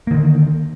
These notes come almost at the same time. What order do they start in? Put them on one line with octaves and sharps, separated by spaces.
A#3 D#3 D3